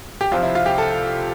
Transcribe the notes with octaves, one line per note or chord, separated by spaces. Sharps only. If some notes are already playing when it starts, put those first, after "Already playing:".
G4
C2 C3 F3 C4 F4
E4
F4
G4
A4